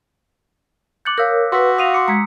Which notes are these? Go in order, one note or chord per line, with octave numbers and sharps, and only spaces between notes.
D6 F#6 G6 A6 C#7 F#7
A#4 C#5 F5 D#6 E6 G6 B6
F#4 B4 C6 E6 B6
F5 D#6 A#6 C7 D#7 F7
C6 D6 C#7
G#3 A#5 G#6 B6 C#7